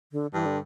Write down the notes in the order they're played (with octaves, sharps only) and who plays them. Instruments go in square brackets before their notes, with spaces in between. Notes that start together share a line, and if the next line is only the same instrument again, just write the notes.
[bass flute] D3
[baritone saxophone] G2 [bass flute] E3
[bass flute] D3